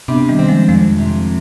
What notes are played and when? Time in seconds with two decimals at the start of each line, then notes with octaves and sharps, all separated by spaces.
0.08 C3 B3 D4
0.29 D#3 G3
0.39 C4
0.48 F3 G#3
0.68 F2 F3 G#3
0.98 C3